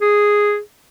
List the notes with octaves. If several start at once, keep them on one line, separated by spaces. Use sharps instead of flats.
G#4